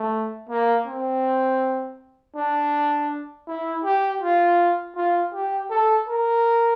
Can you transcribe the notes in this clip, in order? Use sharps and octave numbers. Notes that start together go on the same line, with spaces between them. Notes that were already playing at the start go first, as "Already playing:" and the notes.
Already playing: A3
A#3
C4
D4
E4
G4
F4
F4
G4
A4
A#4